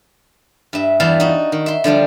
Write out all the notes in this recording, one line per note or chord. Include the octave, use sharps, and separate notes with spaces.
G2 E5
E2 E3 G3 E5 F5 A5
D#4 F#4
D#3
E5 C6
D3 F3 G3 D4